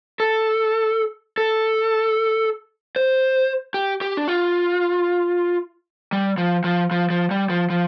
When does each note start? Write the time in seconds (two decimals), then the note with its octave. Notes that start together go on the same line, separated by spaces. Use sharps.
0.20 A4
1.38 A4
2.96 C5
3.74 G4
4.01 G4
4.17 D4
4.28 F4
6.12 G3
6.38 F3
6.64 F3
6.91 F3
7.10 F3
7.31 G3
7.50 F3
7.70 F3